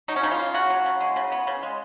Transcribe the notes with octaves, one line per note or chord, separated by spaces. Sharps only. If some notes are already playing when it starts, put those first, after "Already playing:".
F#3 D#4
C#4
C#3 D#4
F4
A#3
C#3 F#4
F#3
C#3
G#3
C#3
B3
C#3
G#3